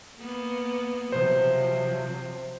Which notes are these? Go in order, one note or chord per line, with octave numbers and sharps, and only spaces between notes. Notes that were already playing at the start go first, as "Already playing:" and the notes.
A#3 B3
C3 F3 F#3 C5